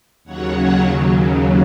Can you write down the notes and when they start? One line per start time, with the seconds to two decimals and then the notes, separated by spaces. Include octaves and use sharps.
0.24 D#2 C#3 F#3 C#5 F#5
0.54 C#5 F#5